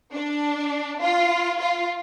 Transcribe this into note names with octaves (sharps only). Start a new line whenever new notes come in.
D4
F4
F4